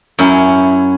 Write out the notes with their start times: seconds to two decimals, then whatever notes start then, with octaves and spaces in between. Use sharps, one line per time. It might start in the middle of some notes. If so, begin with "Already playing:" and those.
0.19 F#2 C#4 E4